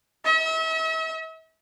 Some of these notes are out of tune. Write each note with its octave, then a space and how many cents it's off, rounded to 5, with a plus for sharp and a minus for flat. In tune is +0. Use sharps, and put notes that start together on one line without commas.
E5 -40